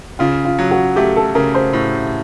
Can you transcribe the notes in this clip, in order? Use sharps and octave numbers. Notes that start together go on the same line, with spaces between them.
C#3 F4
F4
F#3
F#4
A3 G4
A4
C#3 A#4
C5
A2